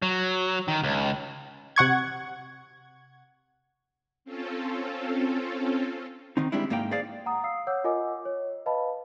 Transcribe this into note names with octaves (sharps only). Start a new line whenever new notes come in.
F#3
D#3
C#2
C3 F#5 C#6 G#6
C4 C#4 F4 A4
D#3 C4 D#4
G3 G#3 C4 D4 E4
G#2 A#3 G4 F5 G5
G#4 C5 D5 F5
F#5 A#5 D#6
F5 D#6 E6 C7
C#5 F#5 D6 E6 G6
F4 A#4 D#5 F#5 G#5 D6
C#5
B4 D#5 F5 A5 B5